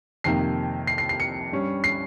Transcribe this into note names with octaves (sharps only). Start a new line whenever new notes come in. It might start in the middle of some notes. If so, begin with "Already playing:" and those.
F2 C3 D#3 A#3 C7
C7
C7
C7
C#7
G2 G3 C#4
C7